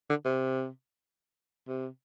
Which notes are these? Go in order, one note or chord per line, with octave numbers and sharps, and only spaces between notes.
D3
C3
C3